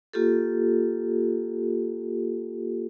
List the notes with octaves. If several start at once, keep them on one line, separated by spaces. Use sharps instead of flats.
A#3 F4 G4 A4